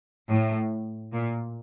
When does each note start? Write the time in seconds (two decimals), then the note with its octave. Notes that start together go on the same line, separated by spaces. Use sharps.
0.29 A2
1.12 A#2